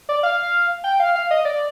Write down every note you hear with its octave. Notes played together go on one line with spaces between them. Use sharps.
D5
F5
G5
F5
F5
D#5
D5